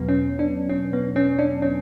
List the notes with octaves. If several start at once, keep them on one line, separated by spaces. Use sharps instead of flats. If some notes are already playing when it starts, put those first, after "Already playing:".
Already playing: E2 B2 F#3 B3
C#4
D4
C#4
B3
C#4
D4
C#4